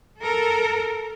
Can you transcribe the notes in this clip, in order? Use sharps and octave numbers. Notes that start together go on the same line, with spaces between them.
A4 A#4